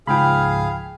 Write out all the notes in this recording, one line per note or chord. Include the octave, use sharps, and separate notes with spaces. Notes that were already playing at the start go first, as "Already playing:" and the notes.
C#2 G#2 F3 G#4 F5 G5 B5